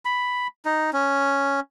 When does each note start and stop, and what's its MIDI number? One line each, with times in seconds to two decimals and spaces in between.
0.05 0.47 83
0.65 0.90 63
0.93 1.60 61